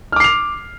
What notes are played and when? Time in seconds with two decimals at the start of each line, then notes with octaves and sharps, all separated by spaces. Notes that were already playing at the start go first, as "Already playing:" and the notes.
0.12 F6
0.16 D6
0.20 C7
0.24 F7